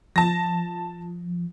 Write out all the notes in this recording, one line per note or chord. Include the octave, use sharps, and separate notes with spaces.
F3 A5 A#6